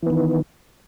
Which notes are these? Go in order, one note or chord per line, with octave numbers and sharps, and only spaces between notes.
D#3 E3 B3